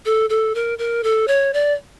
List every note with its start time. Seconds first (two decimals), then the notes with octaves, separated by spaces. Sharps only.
0.06 A4
0.30 A4
0.55 A#4
0.78 A#4
1.04 A4
1.28 C#5
1.54 D5